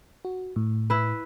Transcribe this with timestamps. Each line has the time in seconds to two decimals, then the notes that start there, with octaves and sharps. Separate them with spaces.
0.25 F#4
0.56 A2
0.90 E4 B4